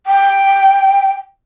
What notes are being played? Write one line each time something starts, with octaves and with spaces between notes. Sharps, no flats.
G5